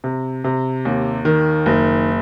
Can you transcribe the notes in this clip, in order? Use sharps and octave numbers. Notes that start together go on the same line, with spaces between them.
C3
C3
D#2
D#3
F#1